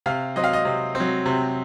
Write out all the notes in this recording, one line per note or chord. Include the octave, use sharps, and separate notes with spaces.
C3 F5
F#3 C4 D#5
F5
D#5
C3
C4
F#3
C3